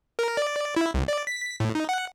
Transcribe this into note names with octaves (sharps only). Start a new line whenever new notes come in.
A#4
D5
E4
C2
D5
B6
B6
A2
D#4
F#5